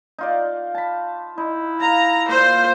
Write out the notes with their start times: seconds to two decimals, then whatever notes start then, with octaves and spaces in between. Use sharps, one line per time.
0.18 D#4 F4 D5
0.75 A5 B5
1.38 D#4 E4
1.82 F5 A#5
2.29 A#2 C5